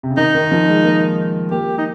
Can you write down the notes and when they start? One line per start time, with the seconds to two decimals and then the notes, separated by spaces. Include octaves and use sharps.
0.03 C3
0.10 C#3
0.17 D#3 D#4
0.35 D#3
0.52 F3
0.68 G#3
0.85 A#3
1.51 A#3 G4
1.78 D#4